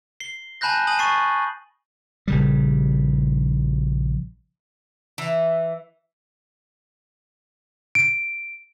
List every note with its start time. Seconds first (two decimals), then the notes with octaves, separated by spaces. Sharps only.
0.20 C7 G7
0.61 G#5 A5 B5 F#6 G6 A#6
0.87 G#5 A5 D#6 F#7
0.99 C#6 A6 C7 D#7
2.28 A#1 C#3 G3
5.18 E3
7.95 D7